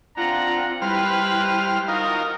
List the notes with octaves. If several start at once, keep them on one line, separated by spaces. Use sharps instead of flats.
C4 D4 F4 F#5 A#5
G3 E4 B4 C5 F6
D#4 F4 F#4 A#4